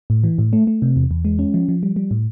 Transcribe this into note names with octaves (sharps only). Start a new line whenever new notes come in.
A2
E3
A2
A3
A3
C3
E2
E2
G#3
C#4
F3
F3
G3
G3
A2